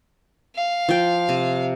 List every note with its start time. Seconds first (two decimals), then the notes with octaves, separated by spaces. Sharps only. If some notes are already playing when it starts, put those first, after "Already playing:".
0.56 F5
0.89 F3 G5
1.29 C3